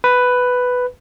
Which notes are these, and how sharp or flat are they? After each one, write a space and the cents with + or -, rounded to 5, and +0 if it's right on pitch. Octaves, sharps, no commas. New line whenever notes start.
B4 +5